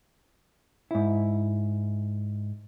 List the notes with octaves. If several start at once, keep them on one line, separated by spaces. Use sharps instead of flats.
G#2 E4